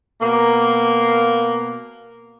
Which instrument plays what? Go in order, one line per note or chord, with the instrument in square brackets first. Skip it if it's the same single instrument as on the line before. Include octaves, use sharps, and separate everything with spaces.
[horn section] B2 A#3